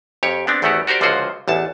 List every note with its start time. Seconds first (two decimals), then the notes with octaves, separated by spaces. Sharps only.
0.23 F2 G4 C#5
0.47 B3 C4 D4
0.62 G#1 E2 A3 B3 F#4 G4
0.87 F#4 G4 A#4 C5 D5
1.01 C#2 D3 F3 F4 F#4 C5
1.48 A1 E2 A5